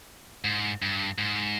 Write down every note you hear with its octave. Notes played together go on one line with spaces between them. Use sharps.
G#2
G2
G#2